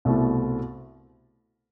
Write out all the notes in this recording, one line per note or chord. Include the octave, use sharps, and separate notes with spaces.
C2 B2 A3 C4 E4